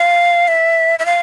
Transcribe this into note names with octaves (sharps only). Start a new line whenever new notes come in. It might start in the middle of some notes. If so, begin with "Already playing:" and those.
Already playing: F5
E5
E5
F5